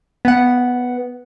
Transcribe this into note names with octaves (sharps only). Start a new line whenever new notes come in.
B3 F#5